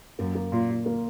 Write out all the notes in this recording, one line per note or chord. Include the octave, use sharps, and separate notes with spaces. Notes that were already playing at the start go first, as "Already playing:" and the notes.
F#2 A#3
A#3
A#2 F4
F4
A#3